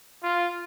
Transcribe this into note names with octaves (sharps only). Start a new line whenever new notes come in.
F4